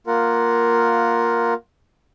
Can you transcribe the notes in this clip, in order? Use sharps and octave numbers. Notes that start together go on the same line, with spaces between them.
A#3 F4 A#4 F#5